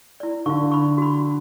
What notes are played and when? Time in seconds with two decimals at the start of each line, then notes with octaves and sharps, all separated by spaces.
0.20 E4 D5
0.46 D3 F5 C#6
0.72 B5 C#6
0.98 F#4 B5